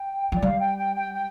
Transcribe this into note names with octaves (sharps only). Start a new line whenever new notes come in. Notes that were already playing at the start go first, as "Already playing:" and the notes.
Already playing: G5
F3 D5
G3 F5
G5
G5
G5
G5